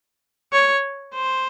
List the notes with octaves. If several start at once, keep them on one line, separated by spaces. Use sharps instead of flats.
C#5
C5